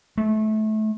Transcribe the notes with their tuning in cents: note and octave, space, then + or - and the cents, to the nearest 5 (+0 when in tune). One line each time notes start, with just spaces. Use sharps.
A3 -25